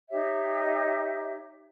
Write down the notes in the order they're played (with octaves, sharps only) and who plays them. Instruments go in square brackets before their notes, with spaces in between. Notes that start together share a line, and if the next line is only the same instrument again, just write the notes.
[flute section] D#4 G4 C#5 E5